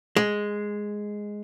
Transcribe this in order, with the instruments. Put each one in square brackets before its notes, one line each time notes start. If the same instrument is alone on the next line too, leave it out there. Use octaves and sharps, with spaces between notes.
[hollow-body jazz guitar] G#3